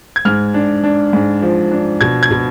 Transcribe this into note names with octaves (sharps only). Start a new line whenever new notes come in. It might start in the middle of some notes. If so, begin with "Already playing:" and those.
G#6
G#2 F6
D4
D4
G#2
F3
D4
B2 G#6
G#6
B2